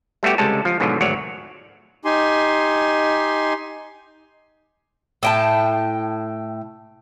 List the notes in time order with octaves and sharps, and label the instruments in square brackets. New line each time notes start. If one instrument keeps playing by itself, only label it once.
[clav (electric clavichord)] G3 A3 B3 F#4 G4
C#2 C3 G3 G#3 A4 A5
F3
G#2 B2 D3 F3 F#3
G#1 D2 F#3 C#5 D5
[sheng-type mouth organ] D#4 G4 G#5 C6
[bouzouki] A2 G5 A5